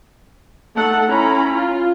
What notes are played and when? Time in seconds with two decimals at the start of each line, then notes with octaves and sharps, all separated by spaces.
0.75 A3 D#4 A4 F#5
1.08 C#4 E4 A#5 B5
1.54 F4